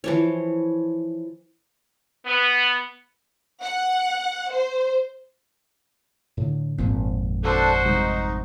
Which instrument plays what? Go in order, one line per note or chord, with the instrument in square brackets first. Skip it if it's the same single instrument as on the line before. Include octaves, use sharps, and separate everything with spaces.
[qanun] E3 F3 C#5
[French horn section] B3
[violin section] F#5
C5
[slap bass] A2 D3
[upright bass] G#1 F2 [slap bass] A#2 F3 C4
[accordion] D4 A4 [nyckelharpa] F#4 C5
[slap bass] C3 G3 G#3 [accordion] D#4